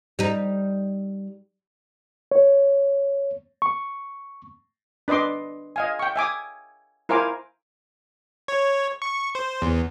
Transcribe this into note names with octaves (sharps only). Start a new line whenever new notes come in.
G3 D#4
C#5
C#6
D4 B4 D#5 C6 D6
D#5 F5 G#5
G5 C#6
E5 G#5 D6 D#6
E4 A#4 C5 F5 G#5 D6
C#5
C#6
C5
E2